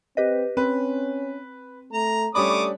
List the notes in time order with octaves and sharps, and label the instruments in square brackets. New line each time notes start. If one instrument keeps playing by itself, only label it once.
[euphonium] C4 [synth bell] G4 B4 D#5
[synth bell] C4 [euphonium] C#4 [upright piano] B4
[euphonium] A3 [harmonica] A#5
[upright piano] G3 C#4 D4 [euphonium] A3 [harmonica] C#5 D6 D#6 [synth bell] B5